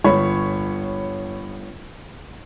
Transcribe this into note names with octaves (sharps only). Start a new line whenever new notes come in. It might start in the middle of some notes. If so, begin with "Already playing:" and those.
G1 C#5 B5 C#6